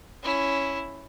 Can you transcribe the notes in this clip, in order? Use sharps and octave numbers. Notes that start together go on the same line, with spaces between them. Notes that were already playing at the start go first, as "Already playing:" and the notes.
C#4 E4